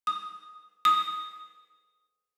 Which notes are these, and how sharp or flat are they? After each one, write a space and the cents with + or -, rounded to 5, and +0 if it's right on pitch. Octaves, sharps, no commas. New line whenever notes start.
D#6 -5
D#6 +0